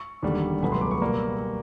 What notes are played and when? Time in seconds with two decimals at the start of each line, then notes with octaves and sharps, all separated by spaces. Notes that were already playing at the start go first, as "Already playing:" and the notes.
Already playing: C#6
0.23 E1 D#2 D3 G3
0.62 C#2 B2 F#3 A3 B5
0.72 C6
0.81 D6
0.91 C#6
1.02 B2 G3 A#3